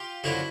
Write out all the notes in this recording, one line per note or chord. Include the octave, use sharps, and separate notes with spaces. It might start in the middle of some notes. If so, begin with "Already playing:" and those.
Already playing: F4 G4
F#2 D3 F3 E4 F#4